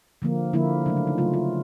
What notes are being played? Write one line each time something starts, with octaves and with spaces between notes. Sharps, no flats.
D3 F3 A#3
D3 F3 A#3 E4
C#3 F#3 A3 D4
D4
D#4
C#3 F#3 A3 F4
F4